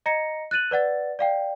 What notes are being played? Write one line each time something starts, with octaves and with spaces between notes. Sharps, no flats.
D#5 A#5 A#6 C#7
F#6 A6 D#7 F#7
B4 D5 F#5 A6
D5 F5 G5